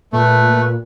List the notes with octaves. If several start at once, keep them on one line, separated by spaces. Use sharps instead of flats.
A#2 A3 B4